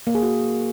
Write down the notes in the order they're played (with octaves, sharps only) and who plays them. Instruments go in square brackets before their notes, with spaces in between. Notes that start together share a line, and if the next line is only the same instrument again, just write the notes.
[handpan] A#3
G#4
F#4